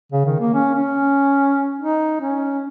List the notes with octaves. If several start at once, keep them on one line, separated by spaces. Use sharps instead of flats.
C#3
D#3
A#3
C#4
C#4
D#4
C#4